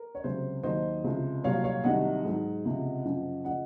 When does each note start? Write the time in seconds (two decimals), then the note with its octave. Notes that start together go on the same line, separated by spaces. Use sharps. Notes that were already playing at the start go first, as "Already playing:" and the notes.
Already playing: A#4
0.15 C#5
0.24 C#2 C3 F#3 C5
0.63 D#2 D#3 F#3 C5 D#5
1.04 C#2 C3 F3
1.44 C2 A#2 F#3 C#5 F5
1.64 C#5 F5
1.84 C2 C3 D#3 F#3 D#5 F#5
2.25 G#2 F#3
2.65 C#2 C3 F3
3.05 F#2 C#3 F3
3.45 C#3 F3 D#5 F#5